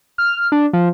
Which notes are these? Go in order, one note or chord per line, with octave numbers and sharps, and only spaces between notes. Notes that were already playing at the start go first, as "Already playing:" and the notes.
F6
D4
F3